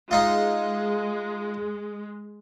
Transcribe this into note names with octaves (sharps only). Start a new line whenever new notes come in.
G#3 D#4 F4